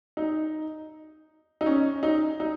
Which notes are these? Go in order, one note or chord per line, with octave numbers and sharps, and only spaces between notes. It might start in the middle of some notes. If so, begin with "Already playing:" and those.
D#4
D#4
C#4
D#4
D#4